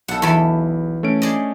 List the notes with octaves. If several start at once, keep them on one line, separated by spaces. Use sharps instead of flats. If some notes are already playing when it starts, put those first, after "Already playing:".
B1 A4 F#5
E2 E3 A4
A3 C#4 D7
G#4 D5 D#5